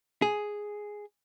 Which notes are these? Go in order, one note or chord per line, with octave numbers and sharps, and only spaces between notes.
G#4